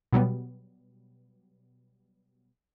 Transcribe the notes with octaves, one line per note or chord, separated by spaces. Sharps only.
B2 F#3 G3 B3